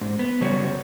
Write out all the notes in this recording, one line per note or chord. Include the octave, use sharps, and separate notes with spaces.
G#2
B3
F#2 C#3 G3 F#4 C#5